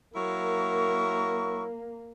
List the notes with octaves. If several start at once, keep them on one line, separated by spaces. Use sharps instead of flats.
F#3 A#3 E4 A#4 C#6